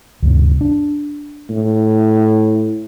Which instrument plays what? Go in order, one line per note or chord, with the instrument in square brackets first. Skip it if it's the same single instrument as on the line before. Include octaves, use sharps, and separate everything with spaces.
[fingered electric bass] D2 G2 C3
D4
[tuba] A2